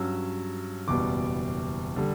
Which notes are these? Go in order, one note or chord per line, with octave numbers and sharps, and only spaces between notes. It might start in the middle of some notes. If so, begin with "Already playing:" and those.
Already playing: G2 F#3 C#4 E6
F#1 E2 B2 G3 D6
D3 G3